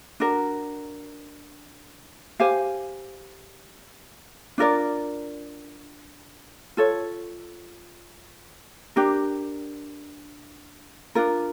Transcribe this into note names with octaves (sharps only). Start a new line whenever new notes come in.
D4 F#4 A#4
G4 C5 F5 G#5
D4 F4 A#4 D5
F4 A4 C#5
D4 G4 A#4
D4 F4 A#4